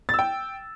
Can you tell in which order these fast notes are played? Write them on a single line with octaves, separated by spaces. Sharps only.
A6 E6 G5